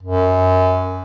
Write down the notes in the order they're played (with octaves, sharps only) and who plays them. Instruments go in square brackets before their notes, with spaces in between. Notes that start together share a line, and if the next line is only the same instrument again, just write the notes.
[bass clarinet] F#2